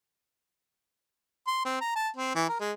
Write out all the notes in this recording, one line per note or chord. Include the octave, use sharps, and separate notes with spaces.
C6
C4
A#5
A5
C4
E3
A#4
G#3